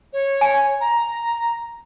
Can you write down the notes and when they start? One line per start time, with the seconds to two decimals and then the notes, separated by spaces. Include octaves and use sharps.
0.13 C#5
0.41 G#5
0.81 A#5